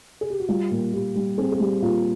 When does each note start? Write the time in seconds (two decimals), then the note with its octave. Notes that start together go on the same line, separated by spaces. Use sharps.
0.21 G#4
0.30 G4
0.40 F#4
0.49 G3 F4
0.71 A#2
0.93 A#2 G4
1.15 G3
1.38 C4 G#4
1.52 G#4
1.59 G3 G4
1.82 A#2 F4